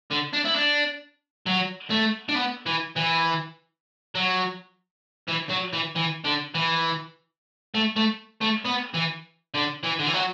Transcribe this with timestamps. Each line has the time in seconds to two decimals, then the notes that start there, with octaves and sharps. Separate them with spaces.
0.11 D3
0.33 D4
0.45 E4
0.55 D4
1.46 F#3
1.90 A3
2.29 D4
2.35 B3
2.66 E3
2.96 E3
4.15 F#3
5.28 E3
5.49 F#3
5.73 E3
5.95 E3
6.24 D3
6.55 E3
7.74 A3
7.96 A3
8.41 A3
8.65 B3
8.94 E3
9.55 D3
9.84 E3
9.99 D3
10.06 E3
10.14 F#3